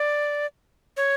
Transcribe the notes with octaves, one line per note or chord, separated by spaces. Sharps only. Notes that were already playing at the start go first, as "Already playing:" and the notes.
Already playing: D5
C#5